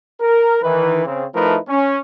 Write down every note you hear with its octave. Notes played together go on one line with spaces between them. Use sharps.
A#4
D#3 E3 B4
C#3 C4
F3 A3 D#4 E4 A#4 B4
C#4